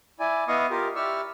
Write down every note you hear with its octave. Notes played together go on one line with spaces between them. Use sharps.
E4 D5 G#5
B3 E4 D#5 F5 C#6 D#6
F4 G4 A#4
E4 G4 D5 C#6 E6 F6